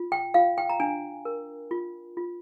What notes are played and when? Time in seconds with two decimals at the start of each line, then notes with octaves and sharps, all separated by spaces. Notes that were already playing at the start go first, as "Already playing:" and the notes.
Already playing: F4
0.12 G5
0.34 F4 F5
0.58 G5
0.70 A#5
0.80 D4 G#5
1.25 A#4
1.71 F4
2.17 F4